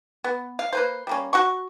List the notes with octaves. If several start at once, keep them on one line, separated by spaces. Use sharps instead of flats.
B3
F5
A#3 B4 C5
G3 A#3 C#4
F#4 F#5 C#6